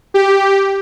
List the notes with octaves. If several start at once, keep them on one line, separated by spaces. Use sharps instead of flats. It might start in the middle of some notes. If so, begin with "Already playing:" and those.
G4